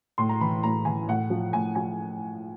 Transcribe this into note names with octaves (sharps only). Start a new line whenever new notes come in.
A2 C6
A#5
E3 B5
A2 A#5
E3 G#5
A2 F#5
F3
A2 G#5
F3 G#5